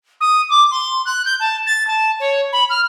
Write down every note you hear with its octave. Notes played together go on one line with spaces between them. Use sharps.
D#6
D6
C6
F#6
G6
A5
A6
A5
C#5
B5
F6